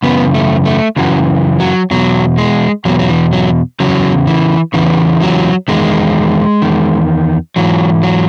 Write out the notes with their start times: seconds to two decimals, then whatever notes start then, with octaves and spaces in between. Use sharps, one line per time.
0.03 F#2 C#3 E3 B3
0.34 A3
0.65 A3
0.96 F#2 C#3 E3 F#3
1.60 F#3
1.91 E2 B2 F#3
2.38 G#3
2.85 E2 B2 F#3
2.99 F#3
3.09 E3
3.33 F#3
3.80 E2 C#3 F#3
4.27 E3
4.74 E2 C#3 E3
5.22 F#3
5.68 E2 D#3 G#3
6.62 E2 D#3
7.56 G#2 E3 F#3
8.03 F#3